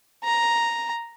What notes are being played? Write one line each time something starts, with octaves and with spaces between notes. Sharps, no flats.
A#5